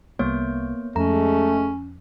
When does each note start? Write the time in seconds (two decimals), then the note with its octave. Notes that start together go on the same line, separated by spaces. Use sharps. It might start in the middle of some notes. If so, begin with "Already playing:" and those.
0.19 C2 G3 A#3 B3 C#5
0.96 F2 G#3 A3 C#4 A#5